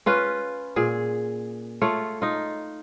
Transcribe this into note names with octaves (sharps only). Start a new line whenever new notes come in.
C#4 F4 B4
A#2 G#4
A3 F4 C#5
D#4 F4